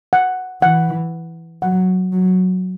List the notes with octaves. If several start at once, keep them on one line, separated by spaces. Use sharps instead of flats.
F#5
E3 F#5
F#3 F#5
F#3